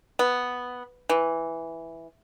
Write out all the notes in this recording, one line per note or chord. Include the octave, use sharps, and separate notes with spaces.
B3
E3